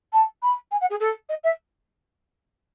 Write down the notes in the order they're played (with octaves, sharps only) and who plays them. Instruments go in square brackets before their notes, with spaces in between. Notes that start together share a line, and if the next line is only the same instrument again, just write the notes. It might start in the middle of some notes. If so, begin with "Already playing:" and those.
[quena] A5
B5
G#5
F#5
G#4
A4
D#5
E5